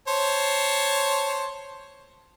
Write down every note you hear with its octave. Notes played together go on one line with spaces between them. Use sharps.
C5 C#5 A5